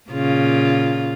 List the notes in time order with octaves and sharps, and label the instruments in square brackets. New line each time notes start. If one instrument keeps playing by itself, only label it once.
[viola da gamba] A#2 C#3 F4